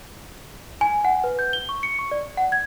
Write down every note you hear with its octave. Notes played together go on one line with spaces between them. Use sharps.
G#5
F#5
B4
G6
G7
C#6
C#7
C#6
D5
F#5
G#6